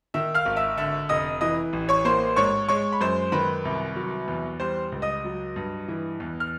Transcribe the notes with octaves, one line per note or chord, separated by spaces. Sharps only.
D#3 E5 E6
F5 F6
G#1
E5 E6
D3 E5 E6
F1 D#5 D#6
E3 D#5 D#6
A1
C#5 C#6
A#3 C5 C6
G#2 C#5 C#6
G#3 C#5 C#6
B5
F#2 C5 C6
D#3 B4 B5
C2
F#3
E2
G3 C5 C6
C#2
D#5 D#6
F#3
G2
E3
E2
F6